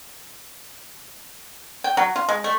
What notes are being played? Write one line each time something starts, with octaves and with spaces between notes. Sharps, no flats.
G5
F#3
F4
G#3
A3